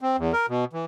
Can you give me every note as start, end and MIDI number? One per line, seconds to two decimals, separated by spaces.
0.01 0.16 60
0.18 0.33 40
0.33 0.46 70
0.49 0.65 47
0.73 0.85 52